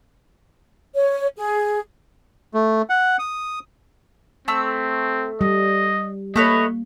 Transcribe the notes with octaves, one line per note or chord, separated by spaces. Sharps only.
C#5
G#4
A3
F#5
D#6
A3 C4 E6
G3 D#5
A3 A#3 B4 C#5 D#5